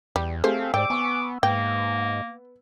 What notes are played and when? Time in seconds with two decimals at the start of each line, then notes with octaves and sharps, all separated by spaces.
0.16 E2 G3
0.44 A3 C4 G4 G#4 C5 F5
0.74 G#2 C5 D5 G5 D6 E6
0.90 B3 G#5 C#6
1.43 G#2 A#3 B3 G5